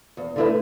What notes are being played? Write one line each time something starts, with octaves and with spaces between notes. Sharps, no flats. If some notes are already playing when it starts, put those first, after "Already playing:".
E2
D3 A3 E4 B4